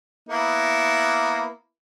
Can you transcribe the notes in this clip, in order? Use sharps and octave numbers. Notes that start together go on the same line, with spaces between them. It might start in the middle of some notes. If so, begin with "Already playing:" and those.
A#3 B3 E4